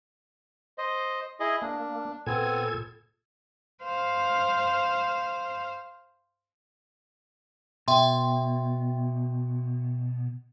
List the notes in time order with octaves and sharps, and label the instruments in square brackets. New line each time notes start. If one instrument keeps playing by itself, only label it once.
[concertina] C5 D#5
E4 G#4 D#5
[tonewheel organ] A#3 [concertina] D4
[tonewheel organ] A#2 A4 G#6 [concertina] B3 C4 G#5
[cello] C5 F5
[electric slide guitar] B2 [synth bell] E5 G5 C6